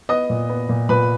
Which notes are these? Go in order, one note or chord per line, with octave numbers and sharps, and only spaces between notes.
B3 D#5 D#6
A#2
B3
A#2
A#2 B4 B5